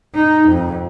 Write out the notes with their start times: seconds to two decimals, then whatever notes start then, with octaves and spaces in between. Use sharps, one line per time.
0.14 D#4
0.49 F2